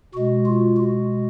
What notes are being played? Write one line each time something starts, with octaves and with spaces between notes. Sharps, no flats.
B2 G#3 F#4
F4
F#4